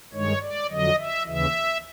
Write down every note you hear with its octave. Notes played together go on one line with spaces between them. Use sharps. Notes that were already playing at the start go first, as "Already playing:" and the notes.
G2 D#3 G#3 C#5
D5
F2 D3 F#3 D#5
E5
D#2 C#3 E3 E5